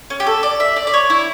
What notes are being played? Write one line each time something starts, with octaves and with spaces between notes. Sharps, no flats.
C#4
G4
A4
D5
E5
D5
D5
C#5
E4